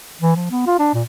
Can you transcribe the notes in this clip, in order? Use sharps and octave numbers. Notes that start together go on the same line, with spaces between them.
E3
F3
B3
F4
D4
A#2